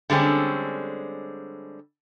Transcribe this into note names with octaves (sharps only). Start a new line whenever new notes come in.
D3 G3 G#3 C4 C#4